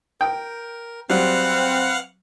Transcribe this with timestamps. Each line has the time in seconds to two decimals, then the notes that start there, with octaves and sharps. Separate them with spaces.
0.21 A#4 G5
1.10 F#3 G3 C4 B4 F5 F#5